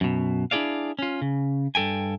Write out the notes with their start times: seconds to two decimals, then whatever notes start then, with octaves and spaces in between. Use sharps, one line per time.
0.01 F#2 B2
0.51 D4 E4 F4 G#4 D5 F5
0.99 C#4 F4
1.22 C#3
1.75 G2 A4 G5 G#5